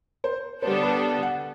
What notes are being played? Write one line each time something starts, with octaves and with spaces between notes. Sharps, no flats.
C5
D3 G3 B3 D4 A4 C5
B4
F#5